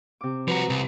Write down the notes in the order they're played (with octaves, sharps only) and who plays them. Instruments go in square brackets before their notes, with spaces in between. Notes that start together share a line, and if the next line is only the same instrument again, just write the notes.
[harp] C3 D6
[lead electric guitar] F3 F#4 [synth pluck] B4 A#5
[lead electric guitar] C2